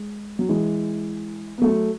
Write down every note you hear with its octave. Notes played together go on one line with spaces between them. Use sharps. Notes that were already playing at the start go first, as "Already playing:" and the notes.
Already playing: G#3
F#3
E3 G#3
B3
F#3 A3